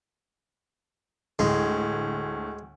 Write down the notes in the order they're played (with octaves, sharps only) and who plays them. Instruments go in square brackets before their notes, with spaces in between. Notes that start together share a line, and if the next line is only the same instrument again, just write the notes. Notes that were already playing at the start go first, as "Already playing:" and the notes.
[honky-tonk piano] D2 A2 [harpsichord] G#3